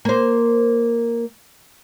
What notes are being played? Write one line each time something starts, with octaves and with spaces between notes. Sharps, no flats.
A#3 C5